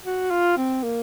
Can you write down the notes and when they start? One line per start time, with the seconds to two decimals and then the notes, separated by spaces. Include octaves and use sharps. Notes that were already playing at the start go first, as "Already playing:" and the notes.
0.05 F#4
0.31 F4
0.57 C4
0.83 A#3